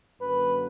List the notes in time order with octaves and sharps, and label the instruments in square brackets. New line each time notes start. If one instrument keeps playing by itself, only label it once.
[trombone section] F#2 D3 F#3 A#3 B4